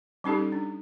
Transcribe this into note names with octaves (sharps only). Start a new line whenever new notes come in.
G3 C#4 D#4 G4 A4
D4